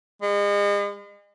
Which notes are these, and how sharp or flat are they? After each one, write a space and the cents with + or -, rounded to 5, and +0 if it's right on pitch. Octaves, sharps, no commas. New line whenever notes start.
G#3 -40